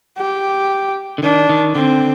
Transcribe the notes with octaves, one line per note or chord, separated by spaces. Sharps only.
G4
D3
D#3 D4
D#3
D3 C4